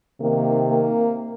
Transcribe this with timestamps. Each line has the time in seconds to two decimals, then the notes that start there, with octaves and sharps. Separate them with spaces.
0.18 C3 D#3 A#3
0.68 A#3